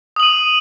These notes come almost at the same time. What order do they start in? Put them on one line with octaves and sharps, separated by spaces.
D#6 F#7 D#7